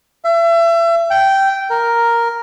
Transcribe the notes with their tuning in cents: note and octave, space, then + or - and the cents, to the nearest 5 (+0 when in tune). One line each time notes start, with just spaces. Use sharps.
E5 +35
G5 -10
A#4 +0